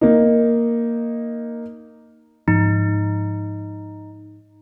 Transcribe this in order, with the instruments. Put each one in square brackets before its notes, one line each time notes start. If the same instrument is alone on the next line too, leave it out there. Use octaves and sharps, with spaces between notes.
[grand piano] A#3 D#4
[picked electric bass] G#2 F3 [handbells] D#4